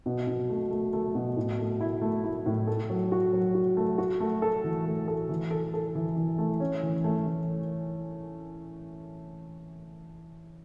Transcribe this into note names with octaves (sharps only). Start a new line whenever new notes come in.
B2
B2
A3
A3
A3
B2
A2
A3
E4
A3
E4
A2
A4
F#3
F#4
F#3
F#4
A3
F#4
A3
A4
E3
A3
A4
E3
A4
A4
E3
E3
A3
C#4
E3
A3
E3